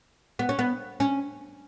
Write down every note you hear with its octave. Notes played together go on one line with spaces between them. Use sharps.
B3
C#4
B3
C#4